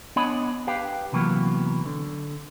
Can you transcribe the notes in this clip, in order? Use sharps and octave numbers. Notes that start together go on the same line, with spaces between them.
B3 D4 C#5 D#5 G#5 B5
G4 B4 F5 G5
C3 E3 F#3 A#3 B3
D3